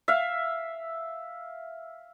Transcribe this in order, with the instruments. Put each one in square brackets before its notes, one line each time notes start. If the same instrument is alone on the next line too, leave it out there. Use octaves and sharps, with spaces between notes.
[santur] E5 F5